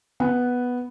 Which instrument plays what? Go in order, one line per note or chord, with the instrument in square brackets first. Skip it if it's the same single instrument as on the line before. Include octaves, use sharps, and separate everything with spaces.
[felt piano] B3